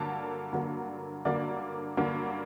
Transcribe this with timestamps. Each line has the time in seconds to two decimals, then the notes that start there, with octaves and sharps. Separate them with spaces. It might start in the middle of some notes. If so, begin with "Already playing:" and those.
Already playing: G2 D3 F#3 A#3 A5
0.53 G2 D3 F#3 A#3
1.25 G2 D3 F#3 A#3 D5
1.97 G2 D3 F#3 A#3